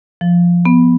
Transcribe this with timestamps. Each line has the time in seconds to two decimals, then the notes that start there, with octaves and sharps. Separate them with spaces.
0.21 F3
0.65 B3